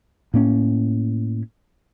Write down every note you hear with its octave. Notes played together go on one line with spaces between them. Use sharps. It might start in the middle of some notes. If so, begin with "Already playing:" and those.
A2 A#3 C#4